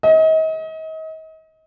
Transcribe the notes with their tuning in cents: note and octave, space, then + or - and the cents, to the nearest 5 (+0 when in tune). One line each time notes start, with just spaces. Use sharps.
D#5 +35